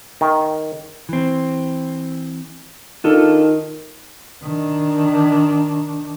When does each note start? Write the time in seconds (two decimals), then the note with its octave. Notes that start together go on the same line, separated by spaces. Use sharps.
0.21 D#3
1.09 E3 C4
3.04 D#3 D4 F4 A4
4.43 D#3 D4